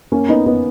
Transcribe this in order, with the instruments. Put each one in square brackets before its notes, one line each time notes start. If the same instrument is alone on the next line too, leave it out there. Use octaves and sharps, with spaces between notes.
[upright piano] A#3 C#4
B3 D#4
B3 D#4